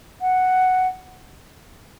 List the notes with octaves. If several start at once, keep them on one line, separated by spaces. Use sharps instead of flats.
F#5